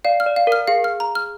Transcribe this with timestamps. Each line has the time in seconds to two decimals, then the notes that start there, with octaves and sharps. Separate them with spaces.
0.05 D5 F5
0.20 F6
0.26 D5
0.36 F5
0.47 A#4 F6
0.68 G#4 F5
0.84 F6
1.00 A#5
1.15 F6